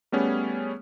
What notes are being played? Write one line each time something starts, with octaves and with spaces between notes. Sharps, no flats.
G3 A3 B3 C#4 G#4